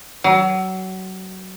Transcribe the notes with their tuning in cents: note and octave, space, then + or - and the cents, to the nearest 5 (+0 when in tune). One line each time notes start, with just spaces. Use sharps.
F#3 +25